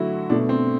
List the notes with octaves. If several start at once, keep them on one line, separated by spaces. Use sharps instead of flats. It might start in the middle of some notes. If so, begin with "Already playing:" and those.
Already playing: D3 F#3 A3 E4 F#4
B2 A3 D4
C4